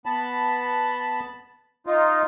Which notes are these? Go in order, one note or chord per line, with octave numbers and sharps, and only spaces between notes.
B3 A5 B5
D#4 F4